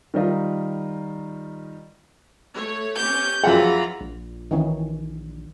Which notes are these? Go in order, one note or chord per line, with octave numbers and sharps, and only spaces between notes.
D#3 G3 D#4 F4 A#4
A3 C#5
C#4 G4 G6
F#2 E3 F3 F4 G#4 F#5 A#5 B5
A#1
D#3 E3 C#4